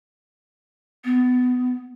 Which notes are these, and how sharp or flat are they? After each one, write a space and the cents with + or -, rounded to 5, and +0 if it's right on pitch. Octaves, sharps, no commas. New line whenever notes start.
B3 +20